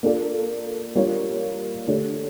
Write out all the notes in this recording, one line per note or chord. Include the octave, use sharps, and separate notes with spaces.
A#3 D4 F4 A4 D5
G3 A#3 D4 F4 C#5
D3 A3 D4 G4 C#5